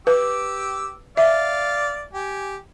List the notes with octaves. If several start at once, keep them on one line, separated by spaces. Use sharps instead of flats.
G4 B4 D6 E6
D5 E5 F5
G4 G#5